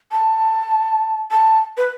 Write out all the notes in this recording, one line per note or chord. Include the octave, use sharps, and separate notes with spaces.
A5
A5
B4